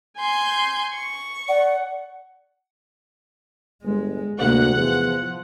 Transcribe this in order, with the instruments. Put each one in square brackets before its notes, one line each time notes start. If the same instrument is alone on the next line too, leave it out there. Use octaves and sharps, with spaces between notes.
[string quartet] G#5 C6 G6
C#6
[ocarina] D5 [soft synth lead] F#5
[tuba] G1 [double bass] G#3
[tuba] D2 [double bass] C3 A#3 [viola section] F#5
[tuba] E2 [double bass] F3